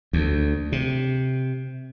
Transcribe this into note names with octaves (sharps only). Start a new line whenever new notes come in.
D2
C3